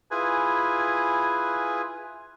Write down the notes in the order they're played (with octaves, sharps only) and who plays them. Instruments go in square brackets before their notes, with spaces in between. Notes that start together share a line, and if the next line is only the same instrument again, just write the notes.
[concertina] E4 F4 G#4 B4 G#5